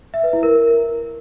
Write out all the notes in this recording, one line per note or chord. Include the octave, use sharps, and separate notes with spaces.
E5
B4
E4
A#4